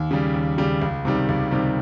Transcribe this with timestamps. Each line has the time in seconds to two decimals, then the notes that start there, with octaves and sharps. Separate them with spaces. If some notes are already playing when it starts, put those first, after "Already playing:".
Already playing: D#2
0.11 C#3 G3
0.34 D#2
0.58 C#3 G3
0.82 C#2
1.05 C3 D#3 G3
1.29 C#2
1.51 C3 D#3 G3